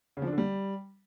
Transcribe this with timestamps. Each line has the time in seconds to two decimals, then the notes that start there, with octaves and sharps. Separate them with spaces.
0.17 C#3
0.22 F3
0.27 D4
0.33 D3
0.38 G3